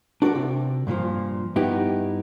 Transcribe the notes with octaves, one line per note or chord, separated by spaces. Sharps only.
D4 F#4 A4 A#4 D5
C3
G2 A#2 E3 F3
G2 B3 D#4 E4 G4